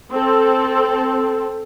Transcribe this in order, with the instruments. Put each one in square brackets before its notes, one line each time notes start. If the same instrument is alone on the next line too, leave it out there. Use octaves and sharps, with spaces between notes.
[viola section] C4 A4